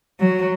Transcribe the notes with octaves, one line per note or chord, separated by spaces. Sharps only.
F#3